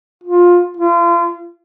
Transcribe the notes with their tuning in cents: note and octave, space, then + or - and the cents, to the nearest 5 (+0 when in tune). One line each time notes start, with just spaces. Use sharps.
F4 +15
F4 -35